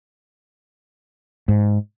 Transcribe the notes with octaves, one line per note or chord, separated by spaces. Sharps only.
G#2